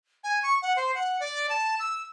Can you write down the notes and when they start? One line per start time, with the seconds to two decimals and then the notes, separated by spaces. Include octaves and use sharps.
0.24 G#5
0.43 C#6
0.62 F#5
0.76 C5
0.95 F#5
1.20 D5
1.49 A5
1.79 E6